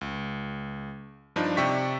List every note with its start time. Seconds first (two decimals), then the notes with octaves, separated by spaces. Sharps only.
0.01 C#2
1.36 G2 F3 D4 D#4
1.57 C3 D5 E5 G5 C#6 B6